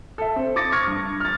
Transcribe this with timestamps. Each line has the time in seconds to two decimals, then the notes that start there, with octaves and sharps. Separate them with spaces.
0.18 A4 E5
0.36 C4
0.56 D6 D#6 A6 A#6 C#7
0.72 C#6 F6 G#6 A#6 C#7
0.88 G2
1.20 F6 A6